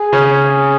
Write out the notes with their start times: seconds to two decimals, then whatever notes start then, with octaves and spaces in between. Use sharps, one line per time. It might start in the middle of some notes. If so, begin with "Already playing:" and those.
Already playing: G#4
0.13 C#3 C#4